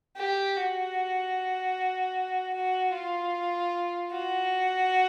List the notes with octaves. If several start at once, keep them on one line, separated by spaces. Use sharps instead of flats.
G4
F#4
F#4
F4
F#4